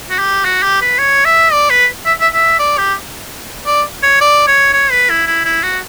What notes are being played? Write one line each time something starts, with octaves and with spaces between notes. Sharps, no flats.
F#4
G4
F#4
G4
B4
C#5
E5
D5
B4
E5
E5
E5
D5
G4
D5
C#5
D5
C#5
C#5
B4
E4
E4
E4
F#4